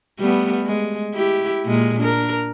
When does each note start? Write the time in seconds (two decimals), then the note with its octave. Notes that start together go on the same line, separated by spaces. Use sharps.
0.20 G3 A3 B3
0.66 G#3
1.14 E4 G4
1.66 A#2 G#3 A#3
1.99 D4 A#4